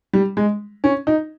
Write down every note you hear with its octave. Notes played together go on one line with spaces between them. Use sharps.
G3
G#3
C#4
D#4